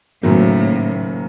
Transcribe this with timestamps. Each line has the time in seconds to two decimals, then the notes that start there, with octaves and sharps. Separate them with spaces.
0.23 F#1 F#2 A2 D#3 F#3 A#3